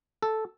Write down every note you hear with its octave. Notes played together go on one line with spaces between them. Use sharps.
A4